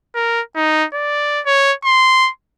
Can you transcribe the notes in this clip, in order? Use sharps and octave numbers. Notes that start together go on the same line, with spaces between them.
A#4
D#4
D5
C#5
C6